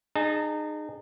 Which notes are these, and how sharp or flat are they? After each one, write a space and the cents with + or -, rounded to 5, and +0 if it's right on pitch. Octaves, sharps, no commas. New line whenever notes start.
D#4 -30 G#4 +0 A5 +0